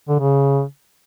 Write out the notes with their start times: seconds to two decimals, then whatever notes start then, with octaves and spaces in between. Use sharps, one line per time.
0.08 D3
0.19 C#3